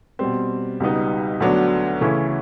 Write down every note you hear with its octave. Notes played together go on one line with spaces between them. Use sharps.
B2 G3 C4
C#2 B2 G3 B3 D#4
D2 D3 F#3 B3 D4
C#3 E3 A3 C#4 E4